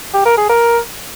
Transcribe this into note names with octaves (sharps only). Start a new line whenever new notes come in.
G4
A#4
G#4
A#4